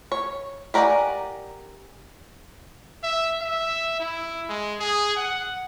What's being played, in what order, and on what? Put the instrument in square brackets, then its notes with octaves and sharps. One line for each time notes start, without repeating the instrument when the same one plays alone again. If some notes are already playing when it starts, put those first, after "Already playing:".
[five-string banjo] C#5
G4 A#4 D5 F#5 G#5
[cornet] E5
E5
E4
G#3
G#4
F#5